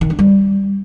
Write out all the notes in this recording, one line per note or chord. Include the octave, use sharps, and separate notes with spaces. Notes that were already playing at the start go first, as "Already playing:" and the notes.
D#3
D4
G3